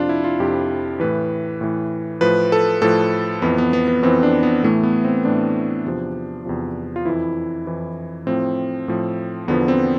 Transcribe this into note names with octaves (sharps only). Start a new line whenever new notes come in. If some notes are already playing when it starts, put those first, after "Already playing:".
Already playing: F2 C3 F3 D4 F4
E4
F4
F2 C3 F3 G4
A2 E3 B4
A2 E3
A2 F3 B4
A4
A2 F3 A4
F2 E3 B3
B3
B3
B3
F2 E3 C4
D4
B3
A2 E3 A3
B3
C4
A2 E3 D4
E2 C3 F3
E2 C3 F3
F4
F2 E3 E4
F2 E3
A2 F3 C4
A2 F3
E2 D3 F3 B3
C4